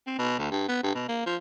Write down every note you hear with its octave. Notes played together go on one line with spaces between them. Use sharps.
C4
B2
D2
G2
B3
G2
B2
A#3
F3